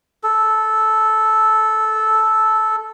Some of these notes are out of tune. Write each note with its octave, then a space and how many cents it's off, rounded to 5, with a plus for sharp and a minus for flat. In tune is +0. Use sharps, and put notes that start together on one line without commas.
A4 -10